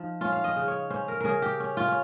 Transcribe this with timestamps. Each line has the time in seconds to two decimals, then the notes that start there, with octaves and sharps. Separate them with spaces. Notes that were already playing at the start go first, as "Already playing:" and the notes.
Already playing: F3 D#4
0.21 C#4 F4
0.32 F5
0.44 D#5
0.56 C#3
0.68 C#5
0.90 C#4 C5
1.08 A#4
1.21 C#3 G#4 A#4
1.42 G4
1.60 C#4
1.77 F4
1.88 C#4